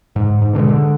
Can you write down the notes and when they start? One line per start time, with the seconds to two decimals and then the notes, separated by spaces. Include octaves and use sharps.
0.16 G#2
0.42 G#2
0.53 B2 D3 F#3 G#3
0.69 D3